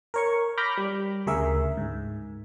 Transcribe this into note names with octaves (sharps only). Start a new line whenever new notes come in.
A#4 C#5 C#6
B5 D6 F6 G6 A#6
G3
D2 C#3 G#4 A#4 E5
G#2